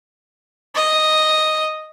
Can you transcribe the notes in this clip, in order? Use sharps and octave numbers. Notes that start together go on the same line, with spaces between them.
D#5